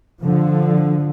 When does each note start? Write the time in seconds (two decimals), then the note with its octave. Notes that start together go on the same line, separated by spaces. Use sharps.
0.22 D3 F3